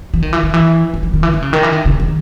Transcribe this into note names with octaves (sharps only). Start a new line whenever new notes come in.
E3
D#3
E3
D#3
E3
D#3
E3
D#3
E3
D#3
C#3
D#3
E3
D#3
C#3
D#3